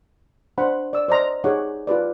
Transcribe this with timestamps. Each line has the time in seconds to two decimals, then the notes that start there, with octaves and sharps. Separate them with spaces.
0.58 D4 C5 F#5 B5
0.93 D5 E6
1.08 C5 D5 D#5 A#5 C6
1.44 D#4 G4 G#4 C#5 F#5 D6
1.87 F4 G4 B4 D5